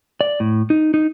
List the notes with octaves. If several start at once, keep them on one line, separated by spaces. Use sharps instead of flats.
D5
A2
D#4
D#4